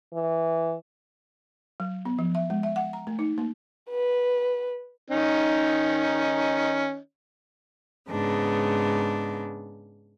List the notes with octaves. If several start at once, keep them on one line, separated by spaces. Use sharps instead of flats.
E3
F#3
B3
F3
E5
G#3
E5
F#5
A#5
A3
D#4
A#3
B4
D#3 C#4 D#4
G#2 C#3 B3 D4